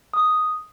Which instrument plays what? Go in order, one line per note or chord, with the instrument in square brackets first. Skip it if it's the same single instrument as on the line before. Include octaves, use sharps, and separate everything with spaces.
[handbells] D#6